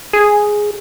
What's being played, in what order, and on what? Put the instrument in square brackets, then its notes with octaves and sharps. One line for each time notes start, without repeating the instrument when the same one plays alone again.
[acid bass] G#4